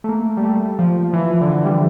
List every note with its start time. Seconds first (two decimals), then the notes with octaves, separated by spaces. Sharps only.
0.04 A3
0.09 A#3
0.37 G3
0.43 A3
0.79 F3
1.13 E3
1.41 D3
1.48 E3
1.65 G3